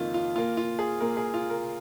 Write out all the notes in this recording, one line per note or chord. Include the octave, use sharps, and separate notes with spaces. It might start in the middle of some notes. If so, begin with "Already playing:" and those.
Already playing: F2 D#3 A#3 F4
F4
A#2 A#3 F4
F4
G#4
A#2 A#3 A#4
G#4
F4
A#4